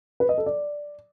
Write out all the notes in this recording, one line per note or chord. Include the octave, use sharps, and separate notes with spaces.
B4
D#5
A4
D5